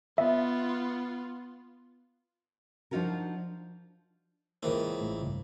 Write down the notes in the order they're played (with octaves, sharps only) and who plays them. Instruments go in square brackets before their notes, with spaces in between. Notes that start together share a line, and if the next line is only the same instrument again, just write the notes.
[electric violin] B3 F4 [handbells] E5
[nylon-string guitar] F3 D4 D#4 F4 F#4 A#4
[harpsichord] C#2 E3 C4 [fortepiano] A#3
[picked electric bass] A1 A3
B1 G2 C#3